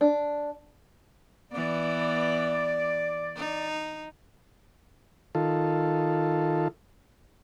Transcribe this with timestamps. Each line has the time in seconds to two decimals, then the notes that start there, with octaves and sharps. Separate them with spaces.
0.01 D4
1.52 E3 B3 D5
3.36 D#4
5.35 D#3 F4 A4